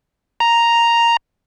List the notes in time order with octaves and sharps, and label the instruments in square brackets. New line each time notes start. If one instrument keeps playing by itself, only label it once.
[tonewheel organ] A#5